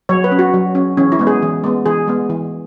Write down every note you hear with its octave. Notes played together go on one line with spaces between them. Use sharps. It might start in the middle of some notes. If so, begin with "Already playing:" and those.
F#3 C#5
B4
C#4
F#4
F#3
C#4
E3 C#4
E4
G#3 B3
G#4
E3
G#3 B3
E3 G#4
G#3 B3
E3